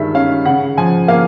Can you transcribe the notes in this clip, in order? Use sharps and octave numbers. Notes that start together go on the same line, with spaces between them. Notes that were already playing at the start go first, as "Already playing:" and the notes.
Already playing: G2 D#3 G#3 E5
C#4 F5
C#3 F#5
F3 G#5
A#3 F5